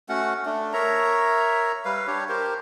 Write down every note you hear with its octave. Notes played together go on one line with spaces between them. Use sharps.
A3 C#4 F#4 F#5
A3 D4
A#4 C#5 E5 A#5
G3 B4 F5
D4 G4 C#5
G4 A#4 C5